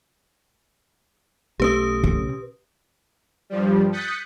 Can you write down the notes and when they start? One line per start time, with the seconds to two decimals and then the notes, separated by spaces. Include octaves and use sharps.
1.60 B1 A3 C#4 G4 B4 D#6
2.04 C#3
3.50 G2 F3 G3
3.92 D#6 F#6 G6 A6 B6 C#7